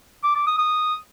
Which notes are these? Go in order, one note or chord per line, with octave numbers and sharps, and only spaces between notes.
D6
D6
D#6
D#6